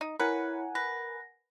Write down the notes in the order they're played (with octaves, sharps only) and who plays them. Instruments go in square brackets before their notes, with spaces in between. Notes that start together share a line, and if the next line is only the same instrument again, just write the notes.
[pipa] D#4
[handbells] E4 C#5 [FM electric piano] A#4 F#5 G#5 [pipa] B4
[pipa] B4 [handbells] A#6